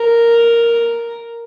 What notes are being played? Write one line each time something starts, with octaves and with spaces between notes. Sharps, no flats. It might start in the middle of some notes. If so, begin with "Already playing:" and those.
Already playing: A#4